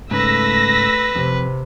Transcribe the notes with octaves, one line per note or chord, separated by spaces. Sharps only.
G#2 C#3 A3 B4 E6 A#6 B6
F2 C3